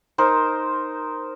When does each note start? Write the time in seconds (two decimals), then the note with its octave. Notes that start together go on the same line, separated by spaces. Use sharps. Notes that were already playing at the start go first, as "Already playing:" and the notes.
0.18 D#4 A#4 C5